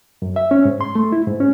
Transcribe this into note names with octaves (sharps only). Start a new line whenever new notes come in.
F#2
E5
C#4
G#2
C6
A3
E4
G#2
C#4